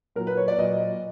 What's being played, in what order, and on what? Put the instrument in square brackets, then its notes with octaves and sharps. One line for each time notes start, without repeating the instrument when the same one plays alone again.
[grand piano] A#2 F#3 A#4
B4
C#5
D5
A#2 F#3 D#5